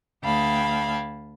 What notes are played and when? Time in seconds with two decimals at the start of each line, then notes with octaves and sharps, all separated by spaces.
0.24 D2 F5 G5 A5 B5 G#6